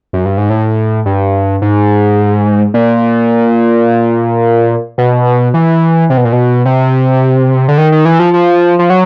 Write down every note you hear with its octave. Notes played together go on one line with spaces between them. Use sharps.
F#2
G2
G#2
A2
G2
G#2
A#2
B2
E3
C3
B2
A#2
B2
C3
D3
D#3
D#3
E3
F3
F3
F3
F#3